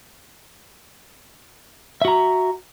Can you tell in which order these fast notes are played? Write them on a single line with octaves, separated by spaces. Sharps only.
E5 F#4 A#5